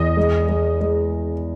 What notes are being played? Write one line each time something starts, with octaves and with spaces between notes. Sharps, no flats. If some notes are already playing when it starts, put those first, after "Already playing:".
Already playing: E2 D#5
G#3
G#3
G#3